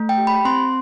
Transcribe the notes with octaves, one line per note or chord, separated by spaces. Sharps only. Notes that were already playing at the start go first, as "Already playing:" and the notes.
Already playing: A3
G5
G4
B5
C4 C6